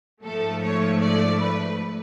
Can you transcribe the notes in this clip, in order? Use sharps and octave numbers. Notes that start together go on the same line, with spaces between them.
G#2 F3 A3 A4
C#5
D5
B4